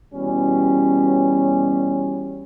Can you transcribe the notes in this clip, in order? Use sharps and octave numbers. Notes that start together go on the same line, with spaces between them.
B2 E3 G3 C#4